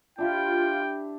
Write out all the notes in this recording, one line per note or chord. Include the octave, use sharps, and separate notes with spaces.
D4 E4 F4 G4 G5